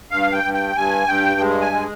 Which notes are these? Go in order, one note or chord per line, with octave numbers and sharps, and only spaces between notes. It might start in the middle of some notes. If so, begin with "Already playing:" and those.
G2 F5
G5
G2
G5
G2 G#5
G2 G5
G#3
G#5
G#3